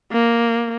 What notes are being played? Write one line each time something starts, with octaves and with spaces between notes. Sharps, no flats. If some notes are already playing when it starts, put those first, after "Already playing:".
A#3